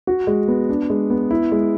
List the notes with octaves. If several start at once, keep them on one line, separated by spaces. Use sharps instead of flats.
F#4
G#3
B3
D4
G#3
B3
E4
G#3